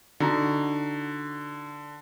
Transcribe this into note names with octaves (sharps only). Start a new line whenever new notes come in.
D3 D#4 F#4